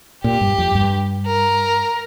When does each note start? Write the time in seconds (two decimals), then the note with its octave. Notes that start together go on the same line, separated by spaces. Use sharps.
0.24 A#2 G4
0.41 G2
0.58 F2
0.75 G2
1.26 A#4